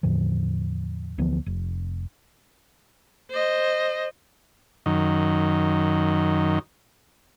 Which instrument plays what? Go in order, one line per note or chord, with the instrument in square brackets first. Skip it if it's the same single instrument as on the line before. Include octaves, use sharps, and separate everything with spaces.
[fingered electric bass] E2 A2 D3 F3
D2 E3 F3 B3
F1
[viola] C5 D#5
[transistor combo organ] F#2 D#3